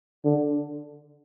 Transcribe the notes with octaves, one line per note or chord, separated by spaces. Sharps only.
D3